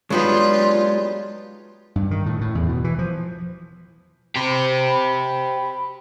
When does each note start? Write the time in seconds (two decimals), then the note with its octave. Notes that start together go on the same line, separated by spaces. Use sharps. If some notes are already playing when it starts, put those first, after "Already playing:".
0.10 F#3 G#3 B3 D4 D#4 F4 G4
1.96 G2
2.11 D#3
2.26 A2
2.41 A2
2.55 E2
2.69 B2
2.84 E3
2.99 F3
4.36 G4 C5 B5